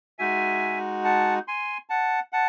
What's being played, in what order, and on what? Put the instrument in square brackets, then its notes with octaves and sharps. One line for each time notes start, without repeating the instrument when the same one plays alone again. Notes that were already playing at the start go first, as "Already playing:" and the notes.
[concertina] G#3 D#4 F#4 E5 G#5
F#5 A5
G#5 C6
F#5 A5
F#5 A5